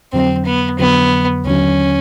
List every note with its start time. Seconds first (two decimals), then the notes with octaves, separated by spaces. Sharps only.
0.13 F2 D3 F#3 C4
0.45 B3
0.79 F2 D3 F#3 B3
1.45 D#2 D3 F#3 C#4